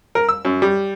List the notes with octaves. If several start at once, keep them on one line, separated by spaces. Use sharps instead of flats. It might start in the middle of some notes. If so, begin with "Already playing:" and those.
A#4
E6
F#2
G3